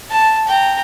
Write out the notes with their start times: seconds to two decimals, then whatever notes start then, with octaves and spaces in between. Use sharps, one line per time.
0.10 A5
0.47 G5 A#5